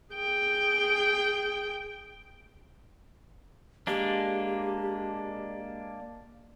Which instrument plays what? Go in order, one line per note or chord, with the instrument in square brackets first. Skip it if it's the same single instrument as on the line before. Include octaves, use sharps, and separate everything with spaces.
[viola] G#4 G5
[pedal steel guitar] G#3 A#3 D4 [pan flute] G4